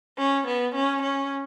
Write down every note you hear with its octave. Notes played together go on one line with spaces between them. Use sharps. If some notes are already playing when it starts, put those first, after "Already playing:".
C#4
B3
C#4
C#4